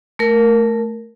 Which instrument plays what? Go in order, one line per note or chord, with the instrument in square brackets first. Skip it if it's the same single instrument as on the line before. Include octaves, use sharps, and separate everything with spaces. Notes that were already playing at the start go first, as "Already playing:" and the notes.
[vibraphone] A3 A#4